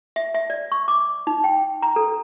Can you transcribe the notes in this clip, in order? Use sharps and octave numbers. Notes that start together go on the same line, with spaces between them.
E5
E5
D5
C#6
D6
D#4
G5
A#5
A4